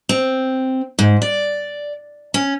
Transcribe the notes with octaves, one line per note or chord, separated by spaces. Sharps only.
C4
G#2
D5
C#4